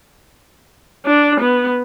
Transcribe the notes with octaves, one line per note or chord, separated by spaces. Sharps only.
D4
B3